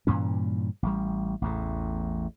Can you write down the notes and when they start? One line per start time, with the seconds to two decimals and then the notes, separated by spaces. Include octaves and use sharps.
0.07 G2 A#2 E3 C#4
0.83 A1 G3
1.42 A1 E2 A2